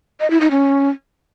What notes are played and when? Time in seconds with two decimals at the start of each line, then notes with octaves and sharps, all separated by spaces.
0.20 D#5
0.30 E4
0.41 D#4
0.51 C#4